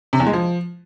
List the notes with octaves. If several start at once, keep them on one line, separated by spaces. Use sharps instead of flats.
C3
E2
G#3
F3